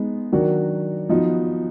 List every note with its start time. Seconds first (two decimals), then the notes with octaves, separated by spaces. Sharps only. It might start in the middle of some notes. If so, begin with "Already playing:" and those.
Already playing: G#3 B3 D#4
0.32 D#3 F#3 D4 F#4
1.09 F3 B3 D#4 F#4